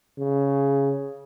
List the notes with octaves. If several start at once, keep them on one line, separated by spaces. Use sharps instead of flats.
C#3